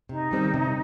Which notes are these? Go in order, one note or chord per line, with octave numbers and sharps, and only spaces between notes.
C3 D#4
D#3 G3 C4
C3